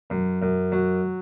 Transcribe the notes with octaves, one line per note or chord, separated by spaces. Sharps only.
F#2
F#2
F#3